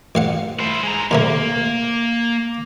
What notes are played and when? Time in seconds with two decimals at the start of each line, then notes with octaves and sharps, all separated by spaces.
0.15 A1 F5 F#5
0.59 E4 C5
0.83 G#3 A#5
1.11 D#2 C3 A3 A#3